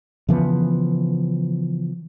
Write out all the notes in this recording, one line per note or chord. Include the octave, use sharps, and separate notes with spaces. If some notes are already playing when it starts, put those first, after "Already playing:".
C#3 E3 F3 B3